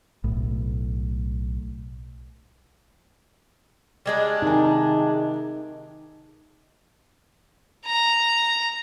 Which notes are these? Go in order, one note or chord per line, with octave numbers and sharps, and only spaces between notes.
B1 A2
G3 G#3 D4
C3 D#3 D#4 G#5
A#5